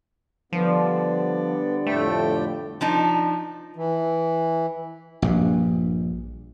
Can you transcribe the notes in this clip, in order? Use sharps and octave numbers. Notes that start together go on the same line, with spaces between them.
D3 F3 G3 B3 D5
F2 A2 A3 G5
F3 D4 D#4
E3
A#1 G2